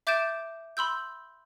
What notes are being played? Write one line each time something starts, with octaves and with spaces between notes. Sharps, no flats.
E5 D6 G6 A6 D7 E7
B5 C6 E6 G6